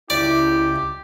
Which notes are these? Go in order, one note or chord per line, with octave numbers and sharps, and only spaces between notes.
C#2 E4 G4 D5